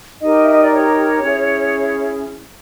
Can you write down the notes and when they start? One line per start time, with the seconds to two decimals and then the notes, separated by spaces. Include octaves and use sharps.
0.21 D#4 G4 A#4 D#5
0.43 E5
0.53 D#5
0.62 D5
0.72 C#5
1.23 C#4 E4 G#4